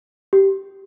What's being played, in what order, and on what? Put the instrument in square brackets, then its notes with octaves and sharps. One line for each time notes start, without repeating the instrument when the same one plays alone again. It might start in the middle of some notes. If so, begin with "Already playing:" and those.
[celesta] G4